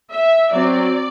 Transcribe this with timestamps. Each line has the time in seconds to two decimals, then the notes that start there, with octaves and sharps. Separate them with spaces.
0.11 E5
0.52 F#3 C4 D5